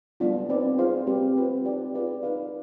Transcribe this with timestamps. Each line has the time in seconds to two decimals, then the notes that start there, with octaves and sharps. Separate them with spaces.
0.20 G3 B3 D4 F4
0.49 C4 D#4 B4 D5 G5
0.78 F4 G#4 C5 F5
1.07 G3 C4 G4 B4
1.36 C4 F4 B4
1.65 D#4 G4 D5 G5
1.94 F4 G#4 B4 D5 F5
2.23 D#4 B4 F5